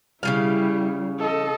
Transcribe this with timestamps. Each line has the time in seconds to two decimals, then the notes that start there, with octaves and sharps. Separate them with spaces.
0.23 C#3 F3 G3 E4 F5
1.19 A4 D#5